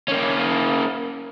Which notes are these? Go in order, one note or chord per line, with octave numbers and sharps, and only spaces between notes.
A#3 C#4